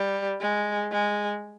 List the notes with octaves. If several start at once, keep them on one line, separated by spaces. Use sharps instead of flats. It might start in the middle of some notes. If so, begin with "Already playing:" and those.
Already playing: G3
G#3
G#3